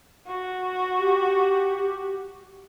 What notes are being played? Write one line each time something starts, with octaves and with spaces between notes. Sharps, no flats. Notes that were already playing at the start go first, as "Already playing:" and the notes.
F#4
G4